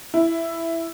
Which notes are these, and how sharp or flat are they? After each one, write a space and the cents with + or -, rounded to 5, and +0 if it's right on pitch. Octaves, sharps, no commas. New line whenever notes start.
E4 +5